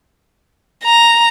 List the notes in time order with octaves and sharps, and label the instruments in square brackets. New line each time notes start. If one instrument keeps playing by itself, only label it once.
[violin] A#5